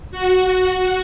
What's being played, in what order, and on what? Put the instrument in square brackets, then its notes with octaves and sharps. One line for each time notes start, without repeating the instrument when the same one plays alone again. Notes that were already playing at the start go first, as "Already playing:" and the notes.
[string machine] F#4